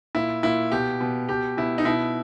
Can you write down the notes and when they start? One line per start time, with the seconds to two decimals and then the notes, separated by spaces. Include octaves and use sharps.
0.15 A#2 E4
0.43 A#2 E4
0.71 B2 G4
1.01 B2
1.29 B2 G4
1.57 B2 E4
1.78 D#4
1.85 B2 E4